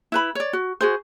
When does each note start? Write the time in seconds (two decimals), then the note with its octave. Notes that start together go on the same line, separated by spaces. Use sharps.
0.12 E4 B4 B5
0.35 C#5 D5
0.53 F#4
0.81 F#4 G#4 C5